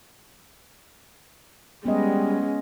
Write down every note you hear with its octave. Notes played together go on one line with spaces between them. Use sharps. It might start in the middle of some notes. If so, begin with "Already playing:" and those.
G3 G#3 B3 C#4 D#5